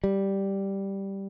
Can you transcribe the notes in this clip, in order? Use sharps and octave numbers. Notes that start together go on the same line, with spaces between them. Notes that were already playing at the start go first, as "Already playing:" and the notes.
G3